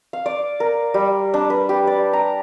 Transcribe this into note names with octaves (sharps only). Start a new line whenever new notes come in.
F5
D5
A#4
G3
D4
B4
G4
D5
A#5